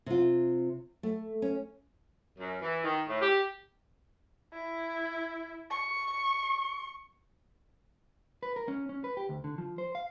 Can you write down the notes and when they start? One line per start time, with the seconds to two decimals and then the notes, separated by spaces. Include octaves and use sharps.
0.06 C3 F4
1.03 A3
1.42 C#4
2.38 F#2
2.61 E3
2.84 D#3
3.08 A2
3.21 G4
4.53 E4
5.70 C#6
8.43 B4
8.56 A#4
8.68 C#4
8.89 C#4
9.04 B4
9.17 G4
9.29 D2
9.44 D3
9.58 F3
9.78 C5
9.95 F5